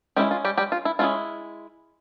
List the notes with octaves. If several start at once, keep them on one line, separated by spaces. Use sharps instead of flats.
G3 G#3 C#4 E4 G4
F4
G3 G4
G3 G4
F4
E4
G#3 C#4 E4 F4